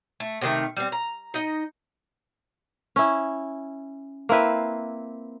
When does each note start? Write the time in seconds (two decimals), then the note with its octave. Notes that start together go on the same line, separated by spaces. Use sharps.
0.20 A3
0.42 C3 D#3 A3
0.77 G3 C4
0.92 A#5
1.34 D#4 D#5
2.96 C#4 E4
4.29 A#3 C4 E4 B4